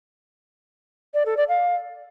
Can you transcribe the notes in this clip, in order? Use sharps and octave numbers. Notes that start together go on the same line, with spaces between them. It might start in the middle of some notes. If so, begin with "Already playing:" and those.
D5
A4
D5
F5